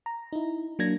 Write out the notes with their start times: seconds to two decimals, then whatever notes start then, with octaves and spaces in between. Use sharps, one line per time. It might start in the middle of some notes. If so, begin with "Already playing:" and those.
0.06 A#5
0.33 D#4 E4
0.79 F#3 A#3 D4 G#6 A#6